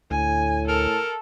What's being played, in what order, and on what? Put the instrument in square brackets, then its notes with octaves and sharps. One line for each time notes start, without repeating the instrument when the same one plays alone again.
[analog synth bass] D2 [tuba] A2 [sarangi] G#5
[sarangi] A4 [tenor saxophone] A#4